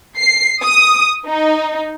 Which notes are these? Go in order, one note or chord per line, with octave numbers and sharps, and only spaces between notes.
C7
D#6
D#4